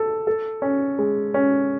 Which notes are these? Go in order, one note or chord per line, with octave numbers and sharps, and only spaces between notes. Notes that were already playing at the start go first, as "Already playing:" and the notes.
Already playing: A4
A4
C#4
G#3
C#4